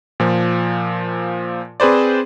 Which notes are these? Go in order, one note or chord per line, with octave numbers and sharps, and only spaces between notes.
A#2 F3
C4 G#4 B4 C5 D5